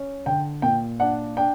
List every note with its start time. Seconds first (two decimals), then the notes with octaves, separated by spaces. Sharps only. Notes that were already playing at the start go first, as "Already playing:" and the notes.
Already playing: C#4
0.26 D3 G5
0.62 A#2 G5
1.00 D4 F#5
1.37 D4 G5